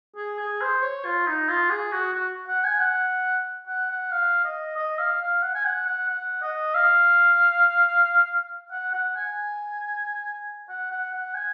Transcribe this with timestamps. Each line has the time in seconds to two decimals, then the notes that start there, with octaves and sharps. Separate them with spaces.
0.17 G#4
0.40 G#4
0.61 C5
0.82 C#5
1.05 F4
1.27 D#4
1.49 F4
1.70 G#4
1.92 F#4
2.14 F#4
2.48 F#5
2.64 G#5
2.79 F#5
3.67 F#5
3.90 F#5
4.12 F5
4.45 D#5
4.77 D#5
4.99 F5
5.21 F5
5.43 F#5
5.55 G#5
5.65 F#5
5.87 F#5
6.09 F#5
6.42 D#5
6.75 F5
8.72 F#5
8.93 F#5
9.16 G#5
10.69 F#5
10.91 F#5
11.13 F#5
11.35 G#5